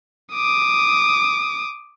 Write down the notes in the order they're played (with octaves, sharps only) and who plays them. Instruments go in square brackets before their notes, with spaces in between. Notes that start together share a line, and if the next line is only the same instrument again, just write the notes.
[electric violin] D6 D#6